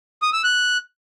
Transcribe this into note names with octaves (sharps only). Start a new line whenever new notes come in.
D#6
E6
F#6